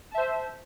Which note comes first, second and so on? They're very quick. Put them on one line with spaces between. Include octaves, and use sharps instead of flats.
A5 E5 C5